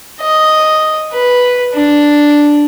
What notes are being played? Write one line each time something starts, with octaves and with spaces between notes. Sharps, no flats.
D#5
B4
D4